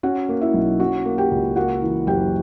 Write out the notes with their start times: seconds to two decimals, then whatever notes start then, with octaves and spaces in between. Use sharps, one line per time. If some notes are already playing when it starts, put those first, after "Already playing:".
0.03 C#4 F#4 F#5
0.29 A#3
0.41 E4 E5
0.54 B1
0.80 C#4 F#4 F#5
1.05 A#3
1.18 G4 G5
1.31 C#2
1.56 A#3 F#4 F#5
1.82 E3
2.07 F#1 G4 G5